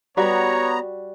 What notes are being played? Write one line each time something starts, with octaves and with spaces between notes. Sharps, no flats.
G3 B3 F#4 C#5 A#5